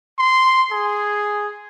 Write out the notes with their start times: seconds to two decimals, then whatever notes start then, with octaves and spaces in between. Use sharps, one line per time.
0.18 C6
0.72 G#4